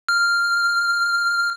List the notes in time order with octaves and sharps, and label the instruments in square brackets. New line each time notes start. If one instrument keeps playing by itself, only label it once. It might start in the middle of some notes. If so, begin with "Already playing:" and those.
[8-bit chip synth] F6